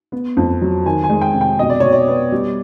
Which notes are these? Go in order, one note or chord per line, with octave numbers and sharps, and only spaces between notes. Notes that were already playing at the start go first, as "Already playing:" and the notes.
B3
F2
F#3
D#3 G#5
G#5
G#3
G5
C3
G5
B2 D#5
D5
B2 C#5
D5
B3
G3